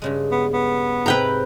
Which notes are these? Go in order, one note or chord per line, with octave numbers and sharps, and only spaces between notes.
G2 C#3 G#3
B3
B3
G#2 C3 E4 B4 G5 A#5